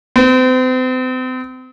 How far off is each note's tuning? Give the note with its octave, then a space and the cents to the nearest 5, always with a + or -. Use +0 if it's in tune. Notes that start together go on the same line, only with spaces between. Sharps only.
C4 -40